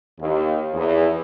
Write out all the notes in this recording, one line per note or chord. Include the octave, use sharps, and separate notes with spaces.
D#2
E2